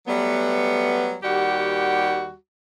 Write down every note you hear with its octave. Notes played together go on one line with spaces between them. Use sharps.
F#3 G3 A3 B3
D#2 G3 F#4 G4 F#5